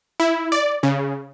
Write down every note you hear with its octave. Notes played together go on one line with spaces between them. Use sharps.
E4
D5
C#3